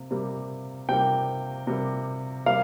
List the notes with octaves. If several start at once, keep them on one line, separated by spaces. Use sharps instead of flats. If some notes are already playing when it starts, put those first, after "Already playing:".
Already playing: C3 A#3
C3 G3 A#3
C3 G3 A#3 G5
C3 G3 A#3
C3 G3 A#3 F5